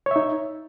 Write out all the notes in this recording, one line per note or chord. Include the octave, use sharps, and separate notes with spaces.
D#4 C#5 E5